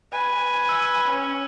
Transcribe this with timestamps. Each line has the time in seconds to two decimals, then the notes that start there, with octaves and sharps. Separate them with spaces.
0.12 B4 G#5
0.69 E6
1.05 C#4